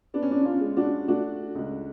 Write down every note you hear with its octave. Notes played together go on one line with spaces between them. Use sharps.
B3 D4
C#4
D4
D4
C#4 F4
G#3
D4 F#4
A3 D4 F#4
C#2